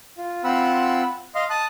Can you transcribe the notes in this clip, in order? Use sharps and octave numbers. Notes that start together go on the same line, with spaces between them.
F4
C4 F4 F#5 B5 E6
D#5 F5 C6
A5 D#6 F#6